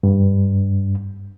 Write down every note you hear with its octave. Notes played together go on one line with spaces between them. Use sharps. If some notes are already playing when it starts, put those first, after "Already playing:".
G2